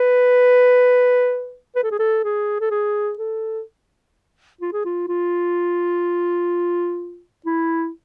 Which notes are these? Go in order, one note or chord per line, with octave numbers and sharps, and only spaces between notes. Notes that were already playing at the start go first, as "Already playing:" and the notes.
Already playing: B4
B4
A4
G#4
A4
G#4
A4
G#4
A4
F4
G#4
F4
F4
E4